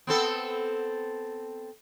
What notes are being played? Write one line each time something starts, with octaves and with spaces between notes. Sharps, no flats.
B3 C4 A4